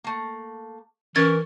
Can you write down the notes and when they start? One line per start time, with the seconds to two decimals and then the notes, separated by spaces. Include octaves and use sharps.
0.04 A3 A#3
1.16 E3 C#4 A#4 G#6 A6